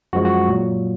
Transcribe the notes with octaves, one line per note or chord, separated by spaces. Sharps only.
F#2 F3 G#3 F#4
F#4
A#2 F#3